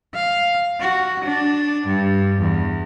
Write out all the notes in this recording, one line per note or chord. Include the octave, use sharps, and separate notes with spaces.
F5
F#4
D4
G2
E2